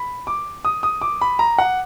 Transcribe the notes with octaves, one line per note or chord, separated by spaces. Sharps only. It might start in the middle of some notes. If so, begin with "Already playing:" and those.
Already playing: B5
D6
D#6
D#6
D6
B5
A#5
F#5